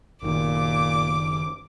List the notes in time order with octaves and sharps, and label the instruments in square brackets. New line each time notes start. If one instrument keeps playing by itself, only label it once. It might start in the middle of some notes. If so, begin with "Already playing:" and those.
[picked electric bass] F#1 D#3 [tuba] A#2 [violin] D6